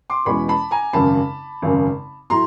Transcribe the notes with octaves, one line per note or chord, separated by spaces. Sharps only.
C6 D6
E2 B2 G#3 C#4 B5 C#6
A5 B5
G#5 A#5
G#1 F#2 C#3 A5 B5
G#1 F#2 C#3
A2 F#3 A#5 C6